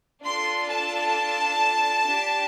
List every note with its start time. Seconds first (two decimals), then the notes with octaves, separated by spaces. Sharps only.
0.23 D4 F4 A4 C6
0.68 A5
2.06 D4 G4